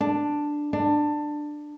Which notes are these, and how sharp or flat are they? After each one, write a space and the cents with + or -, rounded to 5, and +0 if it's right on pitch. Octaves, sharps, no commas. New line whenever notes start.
D4 +5
D4 +15